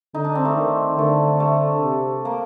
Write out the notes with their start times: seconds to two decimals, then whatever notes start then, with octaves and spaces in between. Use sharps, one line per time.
0.14 D3 D#4
0.24 D4
0.35 C4
0.45 A3
0.56 D#3
0.98 D3 A3
1.40 A3
1.82 C3
2.25 A#3